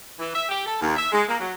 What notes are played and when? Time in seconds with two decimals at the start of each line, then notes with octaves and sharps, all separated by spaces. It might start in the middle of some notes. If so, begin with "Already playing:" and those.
0.19 E3
0.34 E5
0.49 G4
0.66 A4
0.81 D#2
0.96 E5
1.12 G#3
1.28 A#3
1.40 F#3